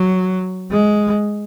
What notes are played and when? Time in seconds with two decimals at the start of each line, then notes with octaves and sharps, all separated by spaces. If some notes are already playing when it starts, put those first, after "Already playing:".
Already playing: F#3
0.71 G#3